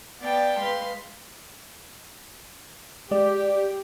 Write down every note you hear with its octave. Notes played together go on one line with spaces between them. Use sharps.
B3 D5 F5 G5 A5
G#3 B4 F5 C6
G#3 G4 D5